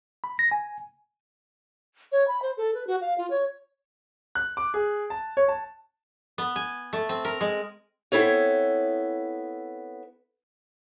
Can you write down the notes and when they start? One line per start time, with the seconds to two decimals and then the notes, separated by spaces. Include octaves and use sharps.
0.24 B5
0.39 A#6
0.51 G#5
2.12 C#5
2.28 B5
2.42 C5
2.57 A4
2.74 B4
2.87 F#4
3.01 F5
3.18 F4
3.30 C#5
4.35 F#6
4.57 D6
4.74 G#4
5.10 A5
5.37 C#5
5.48 A5
6.38 B3
6.56 G#5
6.93 A3
7.09 C4
7.25 A#4
7.41 G#3
8.12 B3 C4 E4 A4 C#5